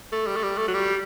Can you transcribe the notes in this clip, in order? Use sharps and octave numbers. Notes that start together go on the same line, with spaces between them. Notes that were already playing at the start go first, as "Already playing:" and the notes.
A3
G3
A3
G3
A3
F#3
G3